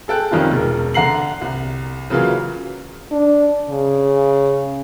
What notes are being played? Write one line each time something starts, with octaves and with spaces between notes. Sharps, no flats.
G#4 A4 G5 F#6
F2 D#3 G3 C#4 D#4 F4
E1 A#4
D3 F#5 A#5 C7 F#7
C2
C#3 E3 F#3 A#3 C#4 F4
D4
C#3